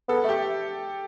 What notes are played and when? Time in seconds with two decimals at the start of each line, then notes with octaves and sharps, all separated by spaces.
0.09 B3 A4
0.24 A3 G4